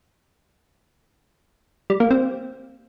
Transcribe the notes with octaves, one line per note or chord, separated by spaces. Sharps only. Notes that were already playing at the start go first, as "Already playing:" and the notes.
G3
A#3
C4